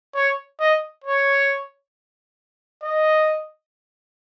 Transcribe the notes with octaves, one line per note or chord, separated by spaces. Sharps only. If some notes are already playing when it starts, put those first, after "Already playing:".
C#5
D#5
C#5
D#5